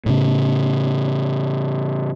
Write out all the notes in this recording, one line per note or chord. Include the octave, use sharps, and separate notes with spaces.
A2 C#3